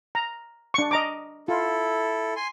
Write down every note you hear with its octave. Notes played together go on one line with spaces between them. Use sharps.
A#5
D4 C#6
D#5 A#5 D6
E4 F4 A4
G#5 C6